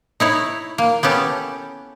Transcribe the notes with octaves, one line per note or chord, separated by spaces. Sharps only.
D#4 E4 C#5
A#3
B3 C#4 G4 A4